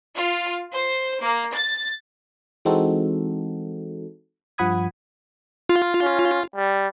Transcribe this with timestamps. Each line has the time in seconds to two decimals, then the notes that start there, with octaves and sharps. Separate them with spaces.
0.16 F4
0.73 C5
1.23 A#3
1.55 A6
2.65 E3 G#3 C4 D#4 F#4 A4
4.58 G2 F3 F#5 B5 D#6 G#6
5.69 F4
6.02 C#4
6.56 G3